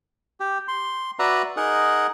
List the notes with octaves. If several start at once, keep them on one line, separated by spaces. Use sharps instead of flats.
G4
C6
F#4 B4 D5 E5 A#5
D#4 G#4 A#4 F#5